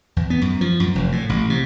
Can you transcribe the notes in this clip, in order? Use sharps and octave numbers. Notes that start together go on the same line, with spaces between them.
E2
B3
F#2
F3
F#2
F1
A2
A1
C3